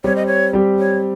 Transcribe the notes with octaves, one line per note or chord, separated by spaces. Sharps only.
G3 C4 G4 C#5
D#5
C#5
G3 C4 G4
C#5